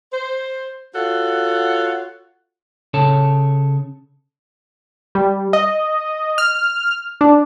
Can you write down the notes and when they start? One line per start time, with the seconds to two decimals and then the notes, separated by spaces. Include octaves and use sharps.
0.12 C5
0.95 F4 F#4 A4 C#5 F#5
2.94 C#3 A4 C#5 A5
5.15 G3
5.53 D#5
6.38 F6
7.21 D4